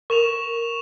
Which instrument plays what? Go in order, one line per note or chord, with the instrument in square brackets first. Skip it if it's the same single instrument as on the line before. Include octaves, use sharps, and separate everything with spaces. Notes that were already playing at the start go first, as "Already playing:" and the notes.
[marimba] A#4 [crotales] C#6 E7 F7